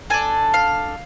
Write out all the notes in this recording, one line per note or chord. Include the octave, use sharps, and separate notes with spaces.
D4 A4 G#5
F5